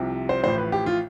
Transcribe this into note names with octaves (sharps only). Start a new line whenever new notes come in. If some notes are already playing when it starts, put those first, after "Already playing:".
Already playing: C2 C3 F3
C5
A1 A2 F3 C5
B4
G4
F4